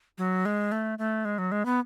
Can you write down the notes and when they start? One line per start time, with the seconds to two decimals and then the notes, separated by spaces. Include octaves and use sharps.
0.18 F#3
0.45 G#3
0.72 A3
0.98 A3
1.25 G#3
1.38 F#3
1.52 G#3
1.65 B3